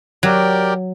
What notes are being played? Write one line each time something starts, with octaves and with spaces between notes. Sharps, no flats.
F#3 G4 A#4 D5 G5